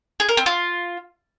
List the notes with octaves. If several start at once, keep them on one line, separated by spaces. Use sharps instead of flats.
G#4
A#4
C4
F4